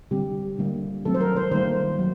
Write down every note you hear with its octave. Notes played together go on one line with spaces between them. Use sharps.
D3 G3 C4 G4
D3 G3 A#3
D#3 F#3 A3 C4 A4
C5
A#4
C5
D#3 G3 A#3 C5
F#3